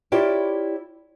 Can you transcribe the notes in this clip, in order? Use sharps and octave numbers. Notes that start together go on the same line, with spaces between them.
E4 F4 G4 C#5 D5